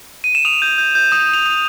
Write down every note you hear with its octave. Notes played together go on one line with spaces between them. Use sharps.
D#7
E7
D#6 F7
G6
G6
G6
D#6 E7
D#6 F7
D#6